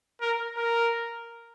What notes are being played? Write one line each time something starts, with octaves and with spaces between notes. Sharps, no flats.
A#4
A#4